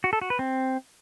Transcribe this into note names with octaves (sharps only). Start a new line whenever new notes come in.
F#4
A4
F#4
B4
C4